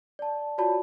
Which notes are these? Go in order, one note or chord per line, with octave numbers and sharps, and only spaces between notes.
D5 A5
F4 F#4 C#5 D5 A5 B5